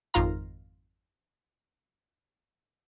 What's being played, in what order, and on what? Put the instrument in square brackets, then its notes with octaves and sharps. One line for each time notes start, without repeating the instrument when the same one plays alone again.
[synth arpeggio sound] G#1 F2 D#3 F4 F5 A#5